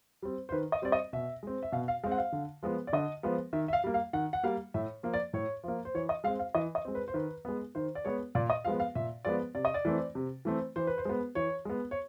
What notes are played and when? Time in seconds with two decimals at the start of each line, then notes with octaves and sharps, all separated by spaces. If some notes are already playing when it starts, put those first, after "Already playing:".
0.22 G3 C4
0.49 C5
0.52 D#3 B4
0.72 D#5
0.82 G3 C4 D5
0.92 D#5
1.13 B2 E5
1.43 G#3 C4
1.63 E5
1.72 B2 F5
1.88 F5
2.04 G#3 C4 F5
2.11 F#5
2.18 F5
2.32 D3
2.63 F3 G#3 B3
2.87 D5
2.93 D3 D#5
3.23 F3 G#3 B3
3.53 D#3 E5
3.68 E5
3.73 F5
3.84 G3 A#3
3.94 F5
4.13 D#3 F#5
4.33 F#5
4.43 G3 A#3 F5
4.74 A2 E5
5.03 F3 A#3
5.14 D5
5.33 A2 C#5
5.63 F3 A#3
5.85 C5
5.95 E3 C#5
6.09 D#5
6.24 G#3 F5
6.27 C4
6.39 F5
6.55 E3 D#5
6.75 D#5
6.85 G#3 C4
6.95 B4
7.08 C5
7.14 D#3 B4
7.45 G#3 B3
7.75 D#3 C5
7.95 D5
8.05 G#3 B3 C#5
8.35 A#2 D5
8.50 D#5
8.65 F3 G#3 B3 F5
8.80 F5
8.95 A#2 E5
9.25 F3 G#3 B3 D5
9.55 C3 D5
9.65 D#5
9.74 D5
9.85 E3 A3 C4
10.15 C3
10.45 E3 A3 C4
10.76 E3 C5
10.87 B4
10.98 C5
11.05 G#3 B3
11.35 E3 C#5
11.65 G#3 B3
11.91 C#5